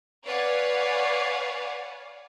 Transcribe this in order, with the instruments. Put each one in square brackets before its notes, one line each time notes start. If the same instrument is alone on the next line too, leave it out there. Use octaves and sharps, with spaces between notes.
[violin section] B4 C#5 D5 F5 F#5 G#5